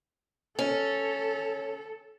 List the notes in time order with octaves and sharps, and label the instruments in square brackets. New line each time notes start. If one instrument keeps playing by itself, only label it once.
[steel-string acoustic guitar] C#4 [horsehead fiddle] A4